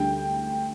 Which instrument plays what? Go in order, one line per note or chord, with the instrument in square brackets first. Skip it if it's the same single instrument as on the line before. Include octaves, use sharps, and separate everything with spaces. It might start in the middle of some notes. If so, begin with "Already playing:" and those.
Already playing: [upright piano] D2 D3 G3 G5